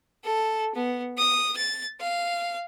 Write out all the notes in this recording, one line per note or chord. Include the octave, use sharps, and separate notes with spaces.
A4
B3
D#6
A6
F5